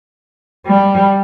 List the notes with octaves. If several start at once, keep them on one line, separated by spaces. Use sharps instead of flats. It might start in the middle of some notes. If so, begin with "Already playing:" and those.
G3